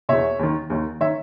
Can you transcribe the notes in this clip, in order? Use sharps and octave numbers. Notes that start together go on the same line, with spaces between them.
E2 B2 C#5 E5
D#2 D#3
D#2 D#3
D#3 C#5 E5